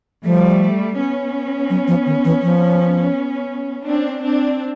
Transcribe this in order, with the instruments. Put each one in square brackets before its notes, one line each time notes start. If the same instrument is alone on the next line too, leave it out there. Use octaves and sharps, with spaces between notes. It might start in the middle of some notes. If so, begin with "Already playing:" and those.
[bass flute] F3 [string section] G3 A3
[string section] B3 C#4
[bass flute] F#3
F3
D#3
E3
F3
[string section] C4 D4
C4 D4